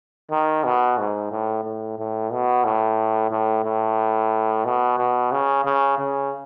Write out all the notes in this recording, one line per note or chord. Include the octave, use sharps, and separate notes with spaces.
D#3
B2
G#2
A2
A2
A2
B2
A2
A2
A2
B2
B2
C#3
C#3
C#3